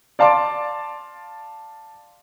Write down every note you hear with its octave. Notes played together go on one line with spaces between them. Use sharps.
D5 F5 A5 C6 D6